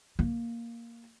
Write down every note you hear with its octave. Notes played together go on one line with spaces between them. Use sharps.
A#3